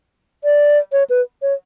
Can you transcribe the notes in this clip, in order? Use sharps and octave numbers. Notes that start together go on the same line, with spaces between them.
D5
C#5
B4
C#5